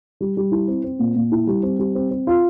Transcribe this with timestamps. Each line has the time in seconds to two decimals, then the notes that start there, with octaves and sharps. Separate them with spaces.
0.21 G3
0.37 G3
0.52 E4
0.68 C4
0.84 C4
0.99 A#2
1.16 A#2
1.32 E4
1.47 G3
1.63 C4
1.79 G3
1.95 C4
2.11 C4
2.27 F4